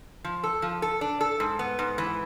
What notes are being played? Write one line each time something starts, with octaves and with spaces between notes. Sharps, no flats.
F3
A4
F3
A4
D4
A4
G#2
B3
G#2
E3